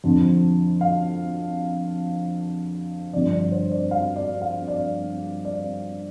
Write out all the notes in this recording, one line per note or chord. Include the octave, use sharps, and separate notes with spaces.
F2 D3 F3
F5
G2 D3 F3 D5
D5
C5
D5
F5
D5
F5
D5
D5